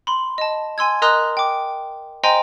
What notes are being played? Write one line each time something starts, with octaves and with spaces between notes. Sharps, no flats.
B5 C6
D#5 A5
G#5 C6 E6 G#6
A#4 D#5 A#5 C6 D#6 F#6
G5 D6
C5 D#5 G5 G#5 A#5 C6